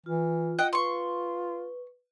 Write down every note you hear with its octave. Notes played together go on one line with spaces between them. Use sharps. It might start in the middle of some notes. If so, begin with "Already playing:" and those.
E3 F4
D#5 F#5 G5
F4 B4 C6 C#6